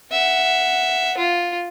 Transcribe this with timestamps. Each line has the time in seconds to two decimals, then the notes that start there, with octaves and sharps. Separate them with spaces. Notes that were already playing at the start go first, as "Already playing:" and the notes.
0.12 E5 F#5
1.17 F4